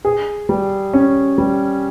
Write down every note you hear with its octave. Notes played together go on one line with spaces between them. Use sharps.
G#4
G3
C#4
G3